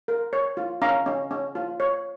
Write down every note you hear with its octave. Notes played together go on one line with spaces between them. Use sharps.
A#4
C#5
F4
C#4 F5 A#5
C#4
C#4
F4
C#5